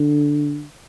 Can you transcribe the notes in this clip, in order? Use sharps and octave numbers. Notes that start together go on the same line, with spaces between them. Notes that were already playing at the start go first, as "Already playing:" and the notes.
Already playing: D3